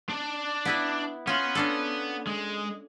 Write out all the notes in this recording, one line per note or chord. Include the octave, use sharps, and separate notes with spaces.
D4 D5
B3 E4 B4
B3 C#4 F4
C#4 D4 A4
G#3